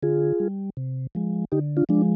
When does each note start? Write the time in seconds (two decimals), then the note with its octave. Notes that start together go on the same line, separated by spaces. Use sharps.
0.03 D3 F4 G#4
0.40 G3
0.77 C3
1.15 F3 G#3
1.52 D3 D#4 G4
1.77 D4 F4
1.89 F3 G#3 D4